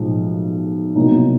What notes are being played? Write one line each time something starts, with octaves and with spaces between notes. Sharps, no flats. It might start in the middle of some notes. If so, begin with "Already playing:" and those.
Already playing: B1 A2 F3 G#3
C2 B2 F#3 A#3 D#4